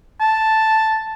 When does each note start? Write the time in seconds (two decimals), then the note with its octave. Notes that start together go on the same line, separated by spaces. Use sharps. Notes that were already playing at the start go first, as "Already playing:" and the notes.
0.21 A5